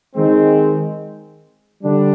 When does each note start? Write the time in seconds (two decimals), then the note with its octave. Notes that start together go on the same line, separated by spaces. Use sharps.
0.16 D#3 G#3 C4
1.83 D3 G3 D4